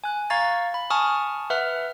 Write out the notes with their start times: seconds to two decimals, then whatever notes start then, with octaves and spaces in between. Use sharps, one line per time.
0.04 G#5 F#6
0.30 F5 A#5 C#6 G#6 A6
0.74 B5
0.90 G#5 A5 C#6 D#6 F6
1.50 B4 E5 F#5 F6